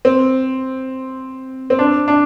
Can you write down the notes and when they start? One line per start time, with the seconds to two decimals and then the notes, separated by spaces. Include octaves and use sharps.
0.05 C4
1.70 C4
1.79 D4
2.08 D4